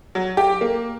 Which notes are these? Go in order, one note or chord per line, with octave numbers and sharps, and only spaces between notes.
F#3
G4
A#3